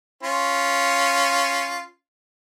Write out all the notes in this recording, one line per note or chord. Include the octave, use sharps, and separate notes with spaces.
C#4 F4